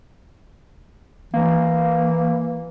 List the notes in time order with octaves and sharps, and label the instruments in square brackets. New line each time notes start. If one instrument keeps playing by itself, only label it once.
[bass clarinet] E3 [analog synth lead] A#3